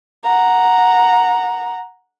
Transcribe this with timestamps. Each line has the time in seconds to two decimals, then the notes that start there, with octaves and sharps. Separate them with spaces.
0.24 F#5 A#5